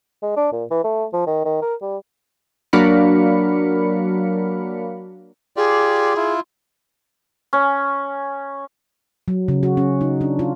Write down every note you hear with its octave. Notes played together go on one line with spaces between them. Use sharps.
G#3
D4
A#2
E3
A3
F3
D#3
D#3
A#4
G3
F#3 A#3 D4 F5 B5 C#7
F4 G4 G#4 D5
E4 F4
C#4
F#3
C#3
F#4
C#4
D#4
D4
F4